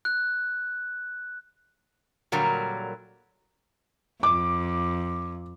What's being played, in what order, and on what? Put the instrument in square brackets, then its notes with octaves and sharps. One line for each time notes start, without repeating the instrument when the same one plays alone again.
[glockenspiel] F#6
[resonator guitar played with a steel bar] A#2 D3 F#3 G3 A#4
[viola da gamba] F2 [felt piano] D6